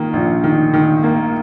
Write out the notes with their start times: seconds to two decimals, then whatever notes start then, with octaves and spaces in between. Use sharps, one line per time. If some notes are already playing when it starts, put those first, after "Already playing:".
Already playing: D#3 A#3
0.13 A#1
0.44 D#3
0.74 D#3
1.04 A#3